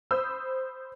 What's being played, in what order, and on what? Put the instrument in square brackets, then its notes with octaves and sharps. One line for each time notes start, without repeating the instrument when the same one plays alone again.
[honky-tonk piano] C5 B5 D#6 E6 G6